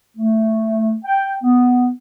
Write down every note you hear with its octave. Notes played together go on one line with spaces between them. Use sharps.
A3
G5
B3